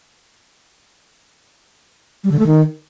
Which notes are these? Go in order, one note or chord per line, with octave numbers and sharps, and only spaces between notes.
G3
D3
A3
D#3